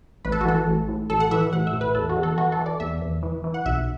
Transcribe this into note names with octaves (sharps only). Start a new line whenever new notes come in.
A1 B4
A4
F#4
E3 A4
A1
A2
A1 A4
F#5
E3 E5
A1 F#5
E5
A2
B4
E2 A4
F#4
E2
A4
E3 F#4
A4
E3
D5
E2 E5
E2
E3
E3
F#5
B1 E5